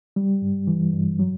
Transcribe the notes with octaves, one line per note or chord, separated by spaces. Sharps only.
G3
G2
E3
G2
F#3